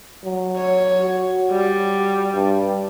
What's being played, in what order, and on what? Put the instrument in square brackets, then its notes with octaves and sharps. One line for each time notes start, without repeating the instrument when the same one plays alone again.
[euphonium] F#3
[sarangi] C#5
[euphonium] F#4
[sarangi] G3
[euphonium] G2